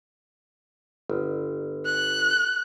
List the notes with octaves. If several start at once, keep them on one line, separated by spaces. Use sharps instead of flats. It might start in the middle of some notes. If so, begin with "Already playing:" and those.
G1
F#6